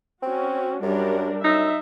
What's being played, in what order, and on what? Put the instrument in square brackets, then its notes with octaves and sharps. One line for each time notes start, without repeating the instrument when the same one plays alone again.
[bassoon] C4 [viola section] C#4 F#4
[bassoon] F#2 [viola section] G3 D4 A#4
[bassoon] F#2 [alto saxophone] D#4 [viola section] E5